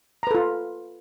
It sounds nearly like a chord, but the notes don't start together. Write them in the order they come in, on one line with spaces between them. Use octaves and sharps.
A#5 B4 A4 F4